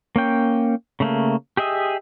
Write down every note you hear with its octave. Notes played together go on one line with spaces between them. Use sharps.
A#3 C#4 G5
C#3 A3 A#3
G4 G#4 D#5 E5